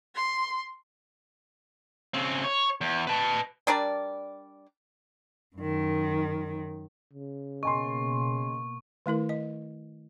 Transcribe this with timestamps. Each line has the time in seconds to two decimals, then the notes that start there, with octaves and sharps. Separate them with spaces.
0.16 C6
2.14 C#3 C4
2.44 C#5
2.81 E2
3.07 B4 A5
3.67 G3 D4 A#4 D5
5.56 F#2 D#3
7.13 C#3
7.63 B2 A#3 D#5 G#5 C6 C#6
9.06 D#3 A3 E4 A#4
9.29 D#5